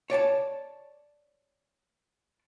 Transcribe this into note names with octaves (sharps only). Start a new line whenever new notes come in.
C#5 D5 G5 A5